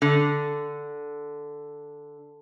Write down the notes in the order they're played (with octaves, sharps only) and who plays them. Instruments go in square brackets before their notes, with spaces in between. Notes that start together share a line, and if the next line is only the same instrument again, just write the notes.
[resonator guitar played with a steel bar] D3